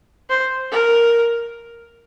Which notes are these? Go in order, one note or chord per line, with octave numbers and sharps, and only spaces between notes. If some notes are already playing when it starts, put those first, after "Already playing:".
C5
A#4